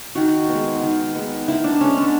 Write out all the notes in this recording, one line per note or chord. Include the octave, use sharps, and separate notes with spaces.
D#3 F#4
G#3 B3
D#3
G#3 B3
D#3 E4
D4
G#3 B3 C#4
D4